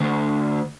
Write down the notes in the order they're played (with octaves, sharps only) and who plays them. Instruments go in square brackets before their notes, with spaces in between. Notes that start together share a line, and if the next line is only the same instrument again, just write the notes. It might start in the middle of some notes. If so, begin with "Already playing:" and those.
[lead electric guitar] D2